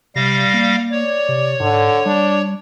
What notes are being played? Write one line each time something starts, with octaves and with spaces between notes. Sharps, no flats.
C3 G3 F5 A#6
A#3
C#5 D5
C3
G#2 D3
G3 D4